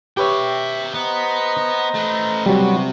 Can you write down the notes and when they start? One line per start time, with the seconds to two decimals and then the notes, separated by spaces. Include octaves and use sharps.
0.17 G4 B4 C#5 E5 G5
0.94 B3 C5 D#5 A#5
1.94 A3 B4
2.46 C3 F#3 G3 B3 D4 F#4